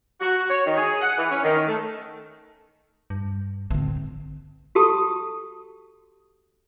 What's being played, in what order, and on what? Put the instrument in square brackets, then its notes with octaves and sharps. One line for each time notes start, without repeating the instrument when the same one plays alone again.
[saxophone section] F#4
C#5
D#3
G#4
F#5
E3
C#4
D#3
A3
[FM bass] G2
[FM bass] A1 [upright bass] D3 C4
[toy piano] F#4 G4 A4 A5 C#6 D#6